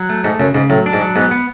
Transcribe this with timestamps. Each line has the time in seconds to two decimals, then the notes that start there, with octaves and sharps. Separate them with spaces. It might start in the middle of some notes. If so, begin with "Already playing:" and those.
Already playing: F#3
0.09 A3
0.24 G#2 A3
0.39 F#2 C#3
0.55 G#2 C#3
0.70 A2 F#3
0.86 D4
0.93 G#2
1.01 F#3
1.16 G#2 B3
1.31 B3